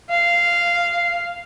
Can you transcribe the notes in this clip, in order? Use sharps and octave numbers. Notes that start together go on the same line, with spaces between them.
F5